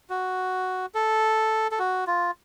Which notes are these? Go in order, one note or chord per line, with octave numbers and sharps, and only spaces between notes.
F#4
A4
A4
F#4
F4